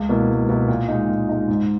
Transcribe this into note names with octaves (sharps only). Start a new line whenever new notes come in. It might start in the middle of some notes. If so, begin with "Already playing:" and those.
Already playing: C#2
B2 A#3 E4
C#2
B2 A#3 E4
A#2
G#3 D#4
A#2
G#3 D#4
G#2